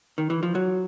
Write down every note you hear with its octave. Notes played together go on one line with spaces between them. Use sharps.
D#3
E3
F3
F#3